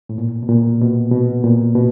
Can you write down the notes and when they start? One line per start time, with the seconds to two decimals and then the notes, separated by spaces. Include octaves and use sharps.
0.09 A2
0.18 A#2
0.43 B2
0.49 A#2
0.81 B2
1.12 B2
1.44 A#2
1.75 B2